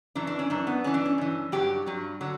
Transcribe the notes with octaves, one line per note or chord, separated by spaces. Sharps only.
F#2 E3 D4
D4
C#4
F#2 E3 D4
B3
G2 E3 C#4
D4
C#4
G2 E3
G2 F#3 G4
G2 F#3
D3 F#3